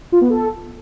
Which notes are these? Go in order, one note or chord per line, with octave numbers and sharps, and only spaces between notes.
F4
B3
A4